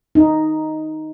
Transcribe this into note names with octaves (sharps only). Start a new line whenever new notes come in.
D#4